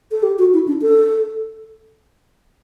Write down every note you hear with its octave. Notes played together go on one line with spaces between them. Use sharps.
A4
G4
F#4
E4
D4
A4